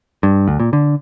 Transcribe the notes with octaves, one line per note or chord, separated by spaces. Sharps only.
G2
D2
A#2
D3